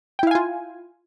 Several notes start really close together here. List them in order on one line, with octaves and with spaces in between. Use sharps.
G5 E4 F5 G#5 F4